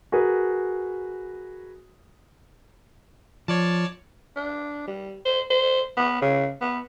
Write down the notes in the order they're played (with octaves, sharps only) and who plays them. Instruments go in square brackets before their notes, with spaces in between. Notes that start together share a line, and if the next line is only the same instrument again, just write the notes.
[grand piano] F#4 G#4 A#4 B4
[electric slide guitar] F3 [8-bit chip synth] C#5 D5 A5
[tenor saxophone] D4
G3
C5
C5
B3
C#3
B3